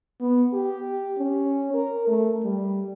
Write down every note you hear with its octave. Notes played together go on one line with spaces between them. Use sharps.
B3
G4
C#4
A#4
A3
G3